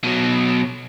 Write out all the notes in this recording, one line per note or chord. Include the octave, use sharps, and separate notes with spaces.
B2 F#3